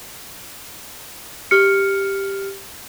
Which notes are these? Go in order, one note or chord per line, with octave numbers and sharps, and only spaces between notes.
G4 F6 C#7